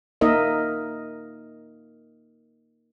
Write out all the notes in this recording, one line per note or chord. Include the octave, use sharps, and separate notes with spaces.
A#3 D#4 A#4 D#5 E5